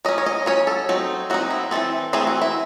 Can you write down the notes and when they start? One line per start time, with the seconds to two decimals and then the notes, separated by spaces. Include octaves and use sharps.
0.05 F#3 C#4 D#5
0.18 C#5
0.26 D#5
0.46 F#3 C#4 C#5
0.67 A4
0.89 F#3 C4 D#4
1.30 F#3 C4 D#4 F#4
1.50 E4
1.71 E3 A3 C4 A4
2.13 E3 A3 C4 G#4
2.27 F#4
2.42 E4